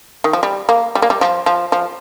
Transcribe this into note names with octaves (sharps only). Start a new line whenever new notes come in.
D#3
F3
G3
A#3
G3
A#3
G3
F3
F3
F3